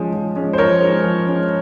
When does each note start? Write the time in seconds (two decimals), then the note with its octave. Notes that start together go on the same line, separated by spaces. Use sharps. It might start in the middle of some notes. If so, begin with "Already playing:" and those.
Already playing: F3 G#3 C#4
0.14 F3
0.36 G#3 C#4
0.53 C5
0.58 F3 A#4 C#5
0.81 G#3 C#4
1.04 F3
1.27 G#3 C#4